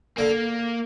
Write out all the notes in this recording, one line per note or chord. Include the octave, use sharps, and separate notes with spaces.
D3 A#3